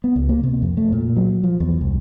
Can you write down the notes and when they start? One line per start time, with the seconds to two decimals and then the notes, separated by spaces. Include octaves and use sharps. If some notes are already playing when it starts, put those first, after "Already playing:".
0.04 B3
0.16 C#2
0.29 A#3
0.43 C3
0.62 F2
0.77 A3
0.92 A#2
1.17 F#3
1.44 F3
1.60 E2
1.81 C2